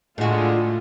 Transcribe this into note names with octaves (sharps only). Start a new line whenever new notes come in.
A2 D3 G#3 F4 F#4